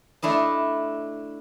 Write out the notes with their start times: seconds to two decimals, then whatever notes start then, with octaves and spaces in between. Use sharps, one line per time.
0.22 A3 D4 E4 D#5